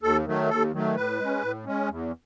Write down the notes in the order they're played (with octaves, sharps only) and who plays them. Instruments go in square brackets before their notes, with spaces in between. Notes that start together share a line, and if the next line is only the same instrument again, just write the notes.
[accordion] D#2 A4
D#3 F#3 A3
D#2 A4
D#3 F#3 A3
A2 B4
G#3 C#4
A2
G#3 C#4
E2